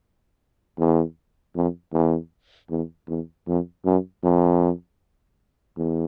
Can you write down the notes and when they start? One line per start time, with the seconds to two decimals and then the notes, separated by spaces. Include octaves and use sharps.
0.79 E2
1.56 F2
1.93 E2
2.70 E2
3.08 E2
3.47 F2
3.85 F#2
4.24 F2
5.77 E2